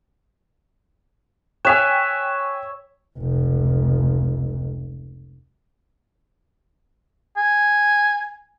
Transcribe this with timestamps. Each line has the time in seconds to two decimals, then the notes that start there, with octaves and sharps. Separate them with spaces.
1.65 C#5 E5 G5 G#5 F#6 E7
3.18 F1 C#2
7.37 G#5